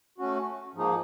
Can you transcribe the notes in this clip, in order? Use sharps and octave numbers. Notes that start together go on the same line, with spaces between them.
A3 C#4 F#4
G#2 F3 A#3 D#4 G#4